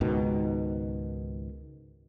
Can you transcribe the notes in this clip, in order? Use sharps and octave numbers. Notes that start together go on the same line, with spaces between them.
C#2 G#2 B2 D#3